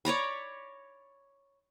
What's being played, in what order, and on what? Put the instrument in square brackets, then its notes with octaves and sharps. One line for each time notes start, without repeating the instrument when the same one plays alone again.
[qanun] C#5 D5 A#5 B5